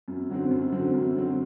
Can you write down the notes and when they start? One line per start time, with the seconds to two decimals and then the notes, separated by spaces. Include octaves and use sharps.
0.08 F#2
0.29 D3 F#3 C4
0.51 F#2
0.72 D3 F#3 C4
0.94 F#2
1.15 D3 F#3 C4